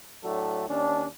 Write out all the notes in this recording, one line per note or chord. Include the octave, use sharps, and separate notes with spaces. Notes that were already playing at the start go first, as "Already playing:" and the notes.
A2 F#3 A3 D4 A4
D#2 C#4 D4